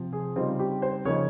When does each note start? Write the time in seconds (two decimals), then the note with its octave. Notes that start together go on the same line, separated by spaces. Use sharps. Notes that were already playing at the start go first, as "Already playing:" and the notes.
Already playing: C3 F3 C4
0.13 G#4
0.36 C#3 G3 C4 D#4 F4
0.59 G4
0.82 C5
1.05 C#3 F3 A#3 D#4 C#5